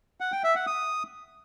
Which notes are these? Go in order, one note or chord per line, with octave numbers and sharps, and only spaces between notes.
F#5
G5
E5
F#5
D#6